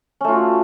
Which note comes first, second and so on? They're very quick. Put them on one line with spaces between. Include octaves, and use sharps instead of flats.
C#4 A3 F4 F#4